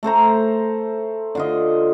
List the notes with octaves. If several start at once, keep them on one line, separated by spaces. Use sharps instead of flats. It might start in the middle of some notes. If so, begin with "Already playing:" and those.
A3 A4 C5 A#5
D3 F4 D#5